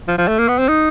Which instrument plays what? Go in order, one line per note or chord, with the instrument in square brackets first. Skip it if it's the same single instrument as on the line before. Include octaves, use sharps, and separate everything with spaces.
[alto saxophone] F3
F3
A3
A#3
B3
C4
D#4